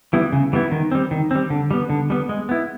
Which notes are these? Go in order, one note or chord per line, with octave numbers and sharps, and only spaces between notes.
E3 G3 B3 E4
C#3
E3 G3 B3 E4
D#3
G3 C4
D#3
G3 C4
D3
G3 B3
D3
G3 B3
G#3
B3 E4